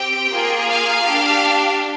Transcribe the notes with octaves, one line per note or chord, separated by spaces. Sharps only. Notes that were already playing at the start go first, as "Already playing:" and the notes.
Already playing: C4 G4 G5
A#3 F4 G#4
F5
D4 G4